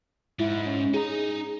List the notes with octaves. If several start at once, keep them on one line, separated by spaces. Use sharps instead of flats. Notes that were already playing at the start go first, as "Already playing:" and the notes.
G#2 E4
C#4
D#4 G#4 A#5